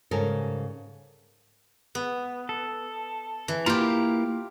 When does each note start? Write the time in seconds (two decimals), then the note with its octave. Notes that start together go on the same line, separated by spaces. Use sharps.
0.11 G#2 C#3 G3 A4 A#4
1.95 B3
2.49 A4
3.48 E3
3.66 A#3 E4 F4 G4 A#5